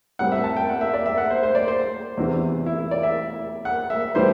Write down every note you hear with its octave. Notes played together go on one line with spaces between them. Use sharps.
A2 G3 C4 F#5
E5
A5
G5
F#5
E5
D5
E5
F#5
C5
C5
D5
C5
E2 C3 E3
E4
E4
D5
E5
F#5
E5
A2 E3 G3 B3 C5